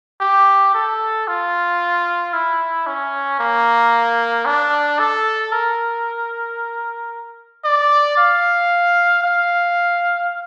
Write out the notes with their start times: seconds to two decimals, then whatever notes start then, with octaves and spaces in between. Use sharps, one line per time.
0.21 G4
0.74 A4
1.28 F4
2.33 E4
2.87 C#4
3.39 A#3
4.46 D4
4.99 A4
5.52 A#4
7.65 D5
8.18 F5
9.24 F5